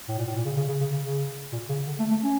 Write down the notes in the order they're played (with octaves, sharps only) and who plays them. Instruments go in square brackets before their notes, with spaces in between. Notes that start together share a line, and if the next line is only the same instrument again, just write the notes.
[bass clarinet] A2
A#2
A2
A#2
C#3
C#3
C#3
C#3
C#3
C#3
A#2
C#3
D3
A3
A3
C#4